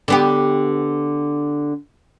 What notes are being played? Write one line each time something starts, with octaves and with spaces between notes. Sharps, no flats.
D3 B3 G4